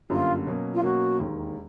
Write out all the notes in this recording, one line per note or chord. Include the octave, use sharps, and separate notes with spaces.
G1 F#2 D3 G3 A#3 F4
B2 F#3 A#3 C#4
F4
B2 F#3 A#3 C#4 F#4
E1 D#2 D#3